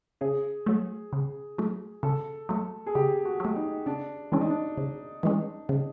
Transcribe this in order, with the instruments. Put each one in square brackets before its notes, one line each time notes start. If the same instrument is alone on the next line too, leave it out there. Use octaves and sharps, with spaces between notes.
[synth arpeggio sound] C#3 [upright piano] G#4
[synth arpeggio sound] F#3 A3
C#3
F#3 A3
[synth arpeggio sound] C#3 [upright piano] A4
[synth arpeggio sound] F#3 A3
[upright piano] G#4
[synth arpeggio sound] C#3 [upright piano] G4
[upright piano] F#4
[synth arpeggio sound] F#3 A3
[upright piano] D#4
[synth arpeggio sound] C#3 [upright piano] D4
[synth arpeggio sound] E3 G#3 C#4 [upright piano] D4
[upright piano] D#4
D4
[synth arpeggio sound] C#3
E3 G#3 C#4
C#3